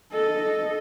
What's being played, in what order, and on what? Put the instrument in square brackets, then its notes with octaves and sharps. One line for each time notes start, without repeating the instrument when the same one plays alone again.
[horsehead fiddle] A4 D#5